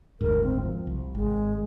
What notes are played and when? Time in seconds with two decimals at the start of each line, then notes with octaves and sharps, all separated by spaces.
0.21 F#1 D2 G#2 A#4
0.44 C4
0.61 F3
0.87 C2
1.15 G#1 G#3